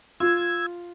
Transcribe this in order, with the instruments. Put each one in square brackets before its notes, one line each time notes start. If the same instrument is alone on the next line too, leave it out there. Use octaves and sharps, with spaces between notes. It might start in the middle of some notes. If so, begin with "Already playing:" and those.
[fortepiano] F4 [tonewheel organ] E6 G#6